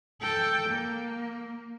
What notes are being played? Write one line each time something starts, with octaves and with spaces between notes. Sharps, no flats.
A4 G5
A#3